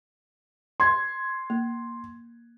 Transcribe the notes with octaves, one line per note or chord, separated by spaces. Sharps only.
C6 G#6
A#3